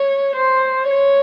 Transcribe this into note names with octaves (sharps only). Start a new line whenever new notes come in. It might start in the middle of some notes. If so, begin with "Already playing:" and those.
Already playing: C#5
C5
C#5